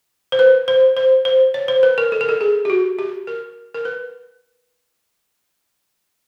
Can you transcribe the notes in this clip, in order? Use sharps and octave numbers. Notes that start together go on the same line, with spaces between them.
C5
B4
C5
C5
C5
C#5
C5
B4
A#4
A4
A#4
A4
G#4
G4
F#4
G4
A#4
A#4
B4